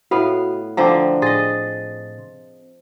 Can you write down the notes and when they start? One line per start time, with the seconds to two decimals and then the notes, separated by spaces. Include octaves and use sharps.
0.11 A2 B3 F#4 F5
0.77 D3 F3 C4 A#5 D6
1.22 A2 G#4 D#5 C6 A6